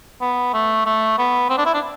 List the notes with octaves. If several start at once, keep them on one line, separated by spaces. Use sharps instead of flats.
B3
A3
A3
B3
C4
D4
E4
D4